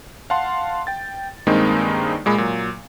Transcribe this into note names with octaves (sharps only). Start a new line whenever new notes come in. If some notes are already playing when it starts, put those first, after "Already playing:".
F5 F#5 A5 C6
G5 A6
G2 D#3 G#3 A#3 C4 D#4
A#2 G#3 B5
A#2 F#3